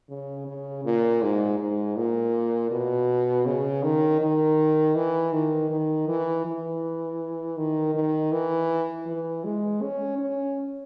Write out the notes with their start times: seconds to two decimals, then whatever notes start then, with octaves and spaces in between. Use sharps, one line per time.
0.09 C#3
0.47 C#3
0.85 A#2
1.22 G#2
1.59 G#2
1.97 A#2
2.71 B2
3.46 C#3
3.83 D#3
4.21 D#3
4.95 E3
5.33 D#3
5.70 D#3
6.08 E3
6.46 E3
7.57 D#3
7.95 D#3
8.32 E3
9.06 E3
9.44 G#3
9.82 C#4
10.19 C#4